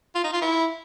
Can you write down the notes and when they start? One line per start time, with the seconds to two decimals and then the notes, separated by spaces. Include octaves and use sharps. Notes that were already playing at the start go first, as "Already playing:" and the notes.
0.15 F4
0.24 D#4
0.33 F4
0.42 E4